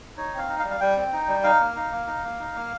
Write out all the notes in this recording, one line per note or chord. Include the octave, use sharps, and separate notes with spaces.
D#4 C#5
C4 F5
D#4
F5
G3
F5
G3 G5
C4
D#4
G3
D#4 F5
A#3
D#4
A#3
D#4
A#3
D#4
A#3